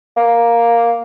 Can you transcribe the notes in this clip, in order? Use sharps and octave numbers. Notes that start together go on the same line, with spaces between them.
A#3